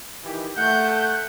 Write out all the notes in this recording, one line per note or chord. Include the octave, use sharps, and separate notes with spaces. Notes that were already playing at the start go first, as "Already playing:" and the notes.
D#3 E3 G4
A3 F#5 G6